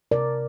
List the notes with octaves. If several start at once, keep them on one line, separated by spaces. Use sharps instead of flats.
C3 A#4 D5